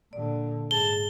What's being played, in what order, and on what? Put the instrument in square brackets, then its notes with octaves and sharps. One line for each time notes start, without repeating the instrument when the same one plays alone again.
[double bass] A#2 D3 [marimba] D5
[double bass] G#2 [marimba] G#4 [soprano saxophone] A5 [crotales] G7